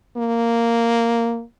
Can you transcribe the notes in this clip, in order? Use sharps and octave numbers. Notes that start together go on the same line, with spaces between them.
A#3